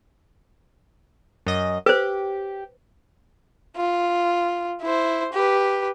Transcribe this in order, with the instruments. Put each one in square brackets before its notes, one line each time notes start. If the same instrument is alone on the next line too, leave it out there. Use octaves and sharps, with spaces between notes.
[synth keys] F#2 D#5
[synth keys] G4 [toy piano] B4 C5
[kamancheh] F4
E4 C5
G4 B4